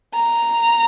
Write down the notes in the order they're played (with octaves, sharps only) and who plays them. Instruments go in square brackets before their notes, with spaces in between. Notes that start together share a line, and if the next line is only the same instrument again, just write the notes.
[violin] A#5